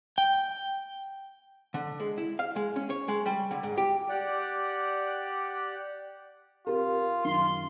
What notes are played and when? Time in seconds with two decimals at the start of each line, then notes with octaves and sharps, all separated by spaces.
0.18 G5
1.74 D3
2.00 G#3
2.18 E4
2.39 F5
2.56 G#3
2.76 C#4
2.90 C#5
3.08 G#3
3.26 G3
3.51 D3
3.63 G#2
3.78 G4
4.09 G4 D5 F#5
6.67 C4 F4 G4 A#4
7.25 F#2 D#3 C6